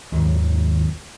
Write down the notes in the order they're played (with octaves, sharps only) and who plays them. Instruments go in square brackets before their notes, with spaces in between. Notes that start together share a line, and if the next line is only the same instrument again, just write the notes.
[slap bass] G#1 D#2 A#2 F#3